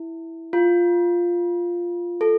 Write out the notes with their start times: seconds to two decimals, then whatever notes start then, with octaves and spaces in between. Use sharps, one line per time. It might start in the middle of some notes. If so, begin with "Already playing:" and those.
Already playing: E4
0.53 F4
2.21 A4